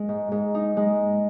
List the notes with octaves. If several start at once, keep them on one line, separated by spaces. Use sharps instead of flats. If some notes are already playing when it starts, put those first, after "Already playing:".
Already playing: G#3
G#2
G#2
D#4
G#3